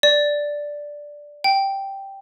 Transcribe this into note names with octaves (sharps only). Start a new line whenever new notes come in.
D5
G5